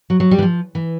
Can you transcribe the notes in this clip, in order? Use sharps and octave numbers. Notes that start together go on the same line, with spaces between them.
F#3
F#3
G3
E3
F3
E3